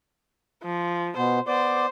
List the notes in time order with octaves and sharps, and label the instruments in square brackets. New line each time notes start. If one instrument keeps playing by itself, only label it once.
[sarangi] F3
[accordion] B2 B3 [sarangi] C5
[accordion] B3 D5 D6 [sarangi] C5